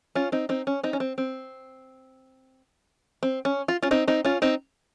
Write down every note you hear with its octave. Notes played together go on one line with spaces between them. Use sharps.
C#4 F4
C4 D#4
C4 D#4
C#4
C4 D#4
C#4
C4
C4
C4
C#4
F4
C#4 F4
C4 D#4
C4 D#4
C#4 F4
C4 D#4